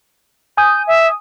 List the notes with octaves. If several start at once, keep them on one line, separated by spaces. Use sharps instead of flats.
G#5 D#6 G6
E5